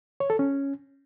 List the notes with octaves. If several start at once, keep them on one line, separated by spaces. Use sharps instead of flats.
C#5
A4
C#4